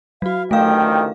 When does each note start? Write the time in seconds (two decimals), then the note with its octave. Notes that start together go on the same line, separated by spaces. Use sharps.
0.22 F#3 F#4 F5
0.51 A1 D2 D#3 A3 F5 G5